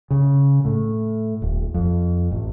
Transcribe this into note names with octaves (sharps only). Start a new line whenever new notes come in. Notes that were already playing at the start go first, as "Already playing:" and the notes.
C#3
A2
D#1
F2
A1